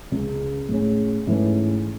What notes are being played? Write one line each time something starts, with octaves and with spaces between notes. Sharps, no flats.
C#2 C#3 G#3
A2 G#3 C#4
G#2 E3 A3 C#4